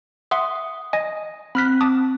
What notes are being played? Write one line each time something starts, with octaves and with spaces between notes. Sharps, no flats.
E5 F#5 C6 D#6
D#5 G#5
C4 B5 F6 F#6 B6
A5 D6 D#6